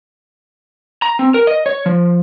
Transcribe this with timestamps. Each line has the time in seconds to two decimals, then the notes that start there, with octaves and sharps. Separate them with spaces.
1.02 A#5
1.19 C4
1.34 A#4
1.47 D#5
1.66 C#5
1.86 F3